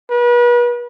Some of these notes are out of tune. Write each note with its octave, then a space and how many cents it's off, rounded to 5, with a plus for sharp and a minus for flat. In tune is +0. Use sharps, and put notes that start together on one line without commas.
B4 -40